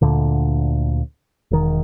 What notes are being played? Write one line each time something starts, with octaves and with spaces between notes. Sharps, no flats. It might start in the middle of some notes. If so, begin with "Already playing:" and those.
D2 A#2 D3
E1 D#3